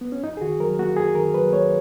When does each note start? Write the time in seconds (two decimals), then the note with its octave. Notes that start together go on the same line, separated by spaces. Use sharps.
0.01 B3
0.12 C#4
0.23 F#2 D#4
0.37 G#4
0.41 D#3 F#4
0.60 F#3 A#4
0.79 A#3 F#4
0.97 F#2 G#4
1.15 D#3 A#4
1.34 F#3 B4
1.52 A#3 C#5